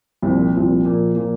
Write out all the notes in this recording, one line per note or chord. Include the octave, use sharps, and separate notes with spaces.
C2 A#2 F3 C4
C2 A#2 F3 C4
A#2 F3 A#3
A#2 F3 A#3